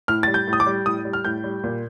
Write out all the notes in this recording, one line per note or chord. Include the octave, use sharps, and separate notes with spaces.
A2 F6
G3 A6
G6
A2
D#6
D6
G3
A2 D#6
G3
F6
A2 G6
G3
A#2